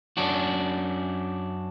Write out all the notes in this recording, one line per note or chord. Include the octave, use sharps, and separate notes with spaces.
F#2 C#4 D4 F#4